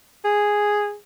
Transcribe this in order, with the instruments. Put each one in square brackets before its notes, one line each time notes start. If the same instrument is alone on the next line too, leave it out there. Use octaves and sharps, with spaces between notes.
[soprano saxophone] G#4